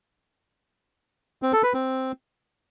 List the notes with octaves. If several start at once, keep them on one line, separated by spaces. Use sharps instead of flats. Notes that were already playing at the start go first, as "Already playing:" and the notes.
C4
A4
B4
C4